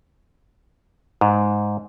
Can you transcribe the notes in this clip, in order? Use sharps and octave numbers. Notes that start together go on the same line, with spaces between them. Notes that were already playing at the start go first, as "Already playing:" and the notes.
G#2